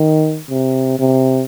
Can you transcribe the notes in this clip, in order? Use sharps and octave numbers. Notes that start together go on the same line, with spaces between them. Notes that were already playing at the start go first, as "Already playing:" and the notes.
Already playing: D#3
C3
C3